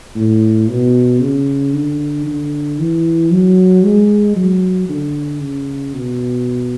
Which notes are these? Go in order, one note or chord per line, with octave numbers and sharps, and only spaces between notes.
A2
B2
C#3
D3
D3
E3
F#3
G#3
F#3
D3
C#3
B2